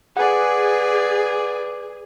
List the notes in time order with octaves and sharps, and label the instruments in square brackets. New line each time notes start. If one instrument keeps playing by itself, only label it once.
[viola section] G#4 [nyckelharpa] B4 D5 [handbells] F#5 G#5